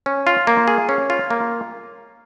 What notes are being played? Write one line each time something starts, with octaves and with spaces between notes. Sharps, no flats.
C#4
F4
A#3
G#4
C#4
F4
A#3